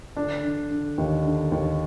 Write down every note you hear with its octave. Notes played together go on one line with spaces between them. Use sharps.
D3 D4
D3
D3
D#2
D3
D#2